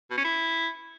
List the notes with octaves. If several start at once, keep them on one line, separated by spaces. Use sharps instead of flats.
B2
C#4
E4